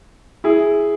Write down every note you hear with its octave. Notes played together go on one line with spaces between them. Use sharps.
E4 G#4